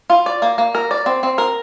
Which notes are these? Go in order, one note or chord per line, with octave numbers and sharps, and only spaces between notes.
F4
D5
A#3
A#3
A#4
D5
C4
C4
A#4